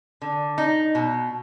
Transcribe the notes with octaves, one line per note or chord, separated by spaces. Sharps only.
D3
D#4
B2